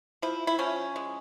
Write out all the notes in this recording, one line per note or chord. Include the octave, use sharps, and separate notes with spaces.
F3 E4
E4
F3 C#4
G#3